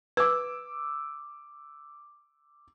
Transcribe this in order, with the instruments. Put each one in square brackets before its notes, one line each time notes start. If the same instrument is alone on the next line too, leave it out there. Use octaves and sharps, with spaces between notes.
[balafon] B4 [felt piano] D6 E6